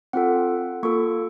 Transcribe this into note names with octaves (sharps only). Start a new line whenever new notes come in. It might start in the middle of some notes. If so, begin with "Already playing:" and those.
C4 F4 A4 F#5
A#3 F4 A4 C#6